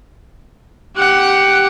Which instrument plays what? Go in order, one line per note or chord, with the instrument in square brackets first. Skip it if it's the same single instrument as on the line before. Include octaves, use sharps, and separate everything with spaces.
[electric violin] G4 F#5